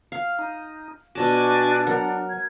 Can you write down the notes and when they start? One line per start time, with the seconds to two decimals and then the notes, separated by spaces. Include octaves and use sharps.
0.12 F5
0.39 D#4
1.15 B2 D4 F#4 D5 G#5 A5 D6
1.87 F#3 A#4 F#5
2.30 G#6